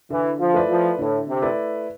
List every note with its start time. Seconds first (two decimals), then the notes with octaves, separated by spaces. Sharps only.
0.10 D3 E3
0.40 F3
0.54 A3 E4 B4 D5
0.69 F3
0.98 A2 D3
1.27 C3
1.42 A3 E4 B4 D5